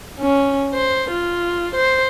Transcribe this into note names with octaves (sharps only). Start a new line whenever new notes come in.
C#4
C5
F4
C5